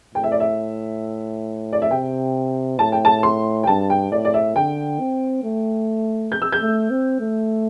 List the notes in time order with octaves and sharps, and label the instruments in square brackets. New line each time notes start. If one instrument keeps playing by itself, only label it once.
[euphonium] A2 [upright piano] G5
[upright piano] E5
D5
E5
D5
E5
[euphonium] C3 [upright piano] G5
[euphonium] A2 [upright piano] A5
[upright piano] G5
A5
C6
G5
[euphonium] G2 [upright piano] A5
[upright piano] G5
[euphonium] A2 [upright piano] D5
[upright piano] D5
E5
[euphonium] D3 [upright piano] G5
[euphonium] C4
A3
[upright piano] G6
E6
G6
[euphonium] A3
C4
A3